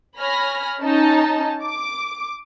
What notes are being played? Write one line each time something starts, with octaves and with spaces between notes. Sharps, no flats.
C#5 G#5 B5 F6 A#6
C#4 D#4 A5
D6